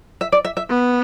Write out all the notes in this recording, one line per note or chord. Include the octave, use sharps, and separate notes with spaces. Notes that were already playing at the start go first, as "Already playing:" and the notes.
E5
D5
E5
E5
B3